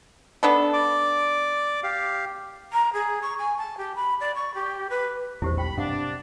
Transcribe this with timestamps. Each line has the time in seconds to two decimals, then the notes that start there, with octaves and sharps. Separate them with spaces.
0.43 B3 D4 A4
0.73 D5 D6
1.83 G4 F5
2.73 A#5
2.93 G#4
3.22 C#6
3.39 G#5
3.58 A5
3.78 G4
3.96 B5
4.21 D5
4.35 C#6
4.54 G4
4.90 B4
5.42 E1 A#1 E2 C4 E4 G4 C5
5.58 B1 G5 B5
5.77 G2 C3 D4 F5 F#5